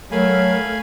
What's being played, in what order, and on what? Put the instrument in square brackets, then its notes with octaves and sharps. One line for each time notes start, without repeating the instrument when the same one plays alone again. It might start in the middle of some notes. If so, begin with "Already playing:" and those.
[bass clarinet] F#3 [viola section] A3 [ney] A#4 [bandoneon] F5 G#5 B5